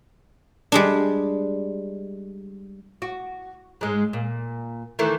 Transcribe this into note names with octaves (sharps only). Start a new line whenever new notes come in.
G3 G#3 D4
F#4
G#2 G#3
A#2
D#3 E3 A3